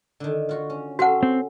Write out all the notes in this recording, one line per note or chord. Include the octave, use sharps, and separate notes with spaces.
D3 D#3
F4 F#4
C#4
C#4 F#4 A4 F#5
C4